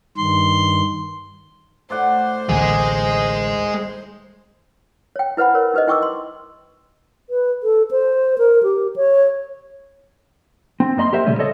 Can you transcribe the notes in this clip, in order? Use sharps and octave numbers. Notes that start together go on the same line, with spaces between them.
G2 D#3 C6
A2 C5 D5 F#5
A1 D2 D#3 E3 G#3 G#4
C#5 G5
E4 B4 C5 F#5 B5
A#4 C#5
D#4 G4 B4 C5 D#5
E4 G5 C#6 D6 E6
C6
B4
A4
C5
A#4
G4
C#5
C4
F#2 A#3 D#5 B5 C6
G4 A#4 C5 E5
C#2 A#2 C#3 G3 A3 C#4
A4 C#5 D#5